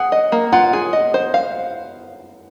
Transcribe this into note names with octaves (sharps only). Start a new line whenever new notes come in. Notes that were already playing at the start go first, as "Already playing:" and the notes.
Already playing: G#4 F#5
D#5
A#3
F4 F#5
G#4
D#5
C5
F5